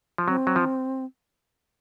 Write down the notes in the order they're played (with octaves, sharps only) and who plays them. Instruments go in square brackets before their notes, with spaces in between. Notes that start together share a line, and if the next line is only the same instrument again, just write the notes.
[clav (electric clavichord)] F3
[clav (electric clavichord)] F#3 [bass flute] C4
[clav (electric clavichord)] F#3
F3